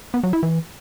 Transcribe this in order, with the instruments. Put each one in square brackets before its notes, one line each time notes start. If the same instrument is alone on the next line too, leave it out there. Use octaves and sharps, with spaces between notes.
[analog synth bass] B3
F#3
E4
E3